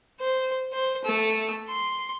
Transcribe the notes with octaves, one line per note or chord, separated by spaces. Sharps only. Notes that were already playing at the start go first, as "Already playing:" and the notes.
C5
C5
A3 E6
C6